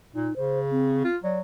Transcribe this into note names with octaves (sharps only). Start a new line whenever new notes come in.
A#2 D#4
C#3 C5
C4
F4
F#3 D5